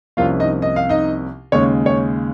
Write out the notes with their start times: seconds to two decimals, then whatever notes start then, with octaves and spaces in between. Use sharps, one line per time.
0.17 C2 C3 F3 A#3 C#4 F4 F5
0.40 D#4 D#5
0.62 D#5
0.76 F5
0.89 D#4 D#5
1.52 D#2 C#3 G#3 C#5
1.86 C#5